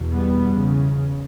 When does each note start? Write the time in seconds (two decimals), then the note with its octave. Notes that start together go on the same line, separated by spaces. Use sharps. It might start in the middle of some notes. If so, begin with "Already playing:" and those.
Already playing: E2 B2
0.13 G3 B3
0.45 E2
0.50 C#3